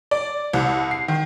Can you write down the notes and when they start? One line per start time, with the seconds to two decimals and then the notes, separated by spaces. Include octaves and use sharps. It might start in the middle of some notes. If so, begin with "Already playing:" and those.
0.11 D5
0.53 C2
0.91 C7
1.08 D#3